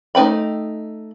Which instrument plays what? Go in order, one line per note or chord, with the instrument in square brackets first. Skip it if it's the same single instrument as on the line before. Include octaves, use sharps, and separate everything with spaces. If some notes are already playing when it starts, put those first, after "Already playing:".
[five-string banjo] A3 D#4 B4 G5 B5